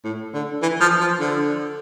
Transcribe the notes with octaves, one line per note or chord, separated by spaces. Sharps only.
A2
D3
E3
F3
F3
D3